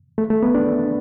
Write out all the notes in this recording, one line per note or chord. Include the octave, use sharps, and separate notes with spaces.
A3
A3
B3
D4